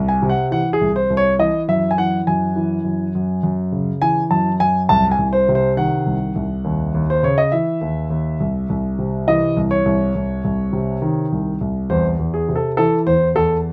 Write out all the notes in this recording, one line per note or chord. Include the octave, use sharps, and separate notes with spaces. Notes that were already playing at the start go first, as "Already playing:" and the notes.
Already playing: C2
G#5
C3
F#5
E3 F#5
G#4
C2
C5
C2
C#5
E3 D#5
F#2 E5
G#5
E3 F#5
F#2 G#5
E3
F#2
F#2
F#2
C#3
E3 G#5
F#2 A5
F#2 G#5
C2 A5
G#5
C2
C5
C3
C5
D#3 F#5
C2
C2
D#2
D#2
C5
C#3 C#5
D#5
E3 E5
D#2
D#2
C2
C2
C3
E3 D#5
C2
C#5
C2
C2
C2
C3
D#3
C2
C2
E2 C5
E2
G#4
C3
A4
E3 A4
E2 C5
E2 A4